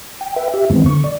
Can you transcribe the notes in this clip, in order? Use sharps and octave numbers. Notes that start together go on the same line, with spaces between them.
G5
B4 E5 G5
G4 E5
F#2 D#3 E3 G#3 B3 C4
D3 C#6
D5